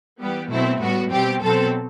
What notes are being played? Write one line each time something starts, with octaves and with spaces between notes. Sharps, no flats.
E3 G3 B3 G4
B2 F#3 A3 C4 E4
A2 G3 B3 F#4
B2 G3 C4 G4
B2 F#3 C4 A4